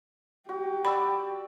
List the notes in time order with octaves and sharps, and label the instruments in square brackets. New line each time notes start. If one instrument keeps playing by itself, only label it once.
[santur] F#4 [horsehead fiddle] G4
[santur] D5 E6 [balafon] B5